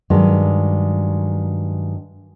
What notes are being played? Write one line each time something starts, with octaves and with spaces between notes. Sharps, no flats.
G2 D#3 F#3 G#3